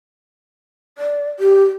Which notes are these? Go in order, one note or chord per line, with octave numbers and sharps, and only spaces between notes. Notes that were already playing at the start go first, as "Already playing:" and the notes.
D5
G4